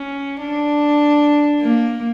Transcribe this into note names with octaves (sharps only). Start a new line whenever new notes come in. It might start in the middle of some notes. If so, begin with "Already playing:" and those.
Already playing: C#4
D4
A#3